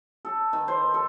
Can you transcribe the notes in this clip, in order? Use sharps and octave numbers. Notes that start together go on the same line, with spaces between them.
A4
D#3
C5
A4